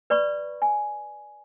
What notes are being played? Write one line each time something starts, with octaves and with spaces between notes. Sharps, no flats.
B4 D5 B5 C#6
G#5